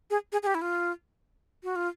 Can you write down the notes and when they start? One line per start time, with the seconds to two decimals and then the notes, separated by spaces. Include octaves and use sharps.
0.10 G#4
0.32 G#4
0.43 G#4
0.47 G4
0.55 E4
0.62 F4
1.64 F#4
1.76 F4